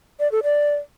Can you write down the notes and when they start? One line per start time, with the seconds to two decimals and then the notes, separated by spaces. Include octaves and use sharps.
0.20 D5
0.32 A4
0.44 D5